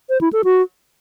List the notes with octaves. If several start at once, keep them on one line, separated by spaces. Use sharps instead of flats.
C5
E4
A4
F#4